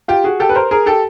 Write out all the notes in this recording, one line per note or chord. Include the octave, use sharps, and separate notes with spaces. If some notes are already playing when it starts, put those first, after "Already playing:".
F4 G4
F#4 G#4
G4 A4
B4
A#4 C5
G#4 A#4
G4 A4